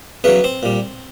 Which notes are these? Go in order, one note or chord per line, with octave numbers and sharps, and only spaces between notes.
E2 C#3 F#3 B3 B4
C4 C5
A#2 G3